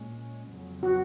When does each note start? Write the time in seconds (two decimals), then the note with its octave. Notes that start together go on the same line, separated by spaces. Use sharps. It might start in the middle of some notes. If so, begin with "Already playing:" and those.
Already playing: A#2 G#3 C#4
0.52 F2 C#3 F#3
0.83 F#4